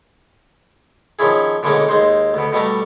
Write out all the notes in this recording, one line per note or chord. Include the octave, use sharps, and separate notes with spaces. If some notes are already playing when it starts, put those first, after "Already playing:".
D#3 F3 C#4 E4 G#4
B2 D3 E3 G#3 A#3 C#4
D#2 G#3 D#4 C5
D2 B2
B2 G3 A3 A#5